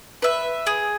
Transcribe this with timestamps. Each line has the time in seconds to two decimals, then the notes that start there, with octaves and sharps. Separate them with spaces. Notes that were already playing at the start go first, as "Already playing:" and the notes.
0.22 B4 E5
0.67 G#4